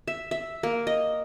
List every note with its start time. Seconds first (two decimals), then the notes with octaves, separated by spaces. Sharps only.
0.08 E5
0.31 E5
0.63 A#3
0.87 D#5